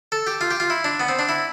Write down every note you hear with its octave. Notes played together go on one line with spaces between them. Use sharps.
A4
G4
F4
G4
F4
E4
D4
B3
C4
D4
E4